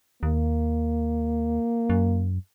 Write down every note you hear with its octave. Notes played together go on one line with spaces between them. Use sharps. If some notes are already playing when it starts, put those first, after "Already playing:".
D#2 A#3
F#2